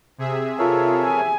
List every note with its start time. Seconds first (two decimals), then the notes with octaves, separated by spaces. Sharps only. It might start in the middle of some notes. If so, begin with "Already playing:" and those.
0.18 C3 G#4 E5
0.59 F4 A4 A#4 C#5
1.03 G#5